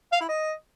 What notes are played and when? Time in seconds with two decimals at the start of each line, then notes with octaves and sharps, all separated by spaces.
0.12 F5
0.20 E4
0.29 D#5